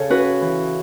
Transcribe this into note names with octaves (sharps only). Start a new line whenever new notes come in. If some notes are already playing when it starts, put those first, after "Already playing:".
Already playing: C#3 A4 C#5
C#4 F#4 B4
E3